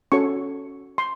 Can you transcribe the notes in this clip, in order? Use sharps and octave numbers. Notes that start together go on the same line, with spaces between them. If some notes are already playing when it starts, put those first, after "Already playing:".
C#4 F#4 A4 C#5 C#6
C6